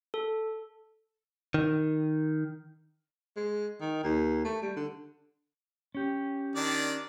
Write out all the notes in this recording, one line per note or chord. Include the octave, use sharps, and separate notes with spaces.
A4
D#3
G#3
D#3
D#2
A3
G3
D3
C#4 G4
D#3 D4 D5